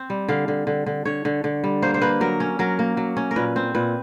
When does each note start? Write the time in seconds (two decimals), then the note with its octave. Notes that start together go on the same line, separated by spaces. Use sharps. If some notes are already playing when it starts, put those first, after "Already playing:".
Already playing: C4
0.10 G3
0.29 D3 F5
0.48 D3
0.67 D3
0.86 D3
1.05 D3 C#5
1.25 D3
1.44 D3
1.64 G3
1.82 A#3 C5
1.94 C5
2.02 A#3 B4
2.21 F#3 A#4
2.40 C#4
2.59 F#3 A#4
2.79 A#3
2.97 F#3
3.17 C#4
3.31 A#4
3.36 A#2 B4
3.56 C4
3.75 A#2 B4